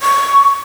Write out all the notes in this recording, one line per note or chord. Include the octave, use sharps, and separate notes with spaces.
C#6